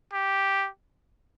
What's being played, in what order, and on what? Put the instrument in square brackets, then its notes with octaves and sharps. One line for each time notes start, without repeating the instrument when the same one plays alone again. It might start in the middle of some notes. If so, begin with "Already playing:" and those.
[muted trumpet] G4